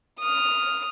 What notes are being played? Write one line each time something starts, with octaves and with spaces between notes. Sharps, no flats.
D#6 F6